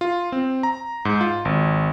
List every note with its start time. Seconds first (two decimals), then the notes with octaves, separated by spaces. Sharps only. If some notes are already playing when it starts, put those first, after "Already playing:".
0.01 F4
0.32 C4
0.63 A#5
1.05 G#2
1.21 F4
1.45 G#1